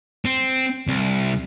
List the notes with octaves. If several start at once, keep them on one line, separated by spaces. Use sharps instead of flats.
C4
C2